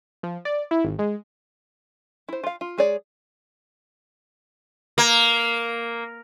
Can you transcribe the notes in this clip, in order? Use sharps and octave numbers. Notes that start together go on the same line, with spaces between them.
F3
D5
E4
G#1
G#3
E4 C5
F4 F5
F4
G#3 G#4 C#5 D5
A#3